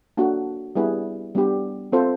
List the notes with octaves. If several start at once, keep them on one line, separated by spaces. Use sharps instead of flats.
A#3 D4 F#4 A4
G3 B3 E4 G#4 B4
G3 B3 D4 G4
C4 F4 A4 C5